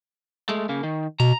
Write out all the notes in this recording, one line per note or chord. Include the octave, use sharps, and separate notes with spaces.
G#3 A3
C#3 A#3
D#3
B2 A#5